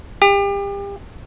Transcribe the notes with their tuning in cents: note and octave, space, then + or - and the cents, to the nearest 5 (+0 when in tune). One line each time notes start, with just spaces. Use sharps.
G4 +35